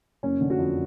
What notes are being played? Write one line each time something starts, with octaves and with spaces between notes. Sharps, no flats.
F#1 C#4
D3
F#4
F2